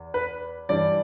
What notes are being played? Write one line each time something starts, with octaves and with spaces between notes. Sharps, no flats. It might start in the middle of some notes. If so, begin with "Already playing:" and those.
Already playing: E2
B4
G2 E3 D5